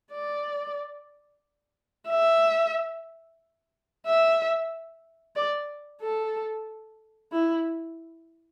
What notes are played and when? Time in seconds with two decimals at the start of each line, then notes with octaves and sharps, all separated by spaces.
0.12 D5
2.08 E5
4.06 E5
5.36 D5
6.01 A4
7.32 E4